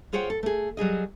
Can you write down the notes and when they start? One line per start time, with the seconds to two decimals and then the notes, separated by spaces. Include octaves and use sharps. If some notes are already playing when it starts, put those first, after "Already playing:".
0.13 F4 G#4 C5 C#5 F#5 G5
0.30 A4
0.43 A3 G#4
0.77 F#3 G3 G#4 D#5